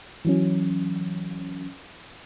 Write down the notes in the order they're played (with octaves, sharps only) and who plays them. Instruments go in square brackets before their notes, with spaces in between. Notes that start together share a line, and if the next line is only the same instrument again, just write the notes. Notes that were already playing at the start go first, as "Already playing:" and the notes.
[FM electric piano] E3 F#3 C#4